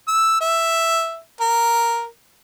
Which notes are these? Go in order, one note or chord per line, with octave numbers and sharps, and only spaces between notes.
E6
E5
A#4